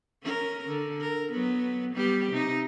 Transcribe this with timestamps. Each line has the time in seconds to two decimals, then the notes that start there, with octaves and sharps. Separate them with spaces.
0.23 C#4 A#4
0.68 D3
1.01 A#4
1.32 F#3 B3
1.93 G3 B3 G4
2.32 C3 D#4